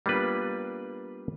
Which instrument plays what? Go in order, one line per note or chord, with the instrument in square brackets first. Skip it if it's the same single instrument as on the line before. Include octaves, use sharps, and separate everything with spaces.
[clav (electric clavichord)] G3 A#3 B3 D4 F4 B4